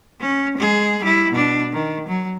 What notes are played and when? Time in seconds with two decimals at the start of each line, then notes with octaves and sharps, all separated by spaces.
0.21 C#4
0.57 G#3 G#4
1.02 G3 E4
1.32 B2 D4
1.73 D#3
2.08 F#3